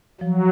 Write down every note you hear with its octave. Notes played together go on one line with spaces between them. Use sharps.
F3 F#3